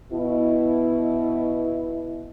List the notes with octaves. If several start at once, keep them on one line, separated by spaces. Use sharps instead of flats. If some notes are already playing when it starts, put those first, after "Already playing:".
B2 E4